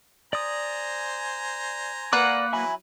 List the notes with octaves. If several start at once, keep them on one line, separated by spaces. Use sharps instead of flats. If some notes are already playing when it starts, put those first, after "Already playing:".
C5 D5 G#5 A#5 D#6
A#3 B4 D5 F#5 D6
F#3 E4 E5 G#5 B5